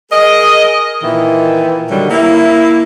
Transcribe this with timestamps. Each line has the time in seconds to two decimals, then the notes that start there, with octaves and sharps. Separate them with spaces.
0.12 G#4 A#4 D#5
1.02 A#2 D#3 E3
1.90 D3 D#3 F#3 G3
2.10 A#3 E4